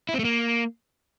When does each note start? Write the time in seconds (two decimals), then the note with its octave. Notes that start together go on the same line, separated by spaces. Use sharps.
0.09 E4
0.14 C4
0.19 A3
0.25 A#3